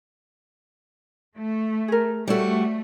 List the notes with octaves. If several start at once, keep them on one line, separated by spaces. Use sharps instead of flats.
A3
G#4 A#4
G3 A3 F#4 A4 C5 C#5